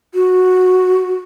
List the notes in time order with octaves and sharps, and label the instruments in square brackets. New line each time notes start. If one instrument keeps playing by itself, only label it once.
[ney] F#4